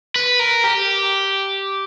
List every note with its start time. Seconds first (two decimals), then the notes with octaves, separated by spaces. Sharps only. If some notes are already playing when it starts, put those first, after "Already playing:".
0.16 B4
0.39 A#4
0.64 G4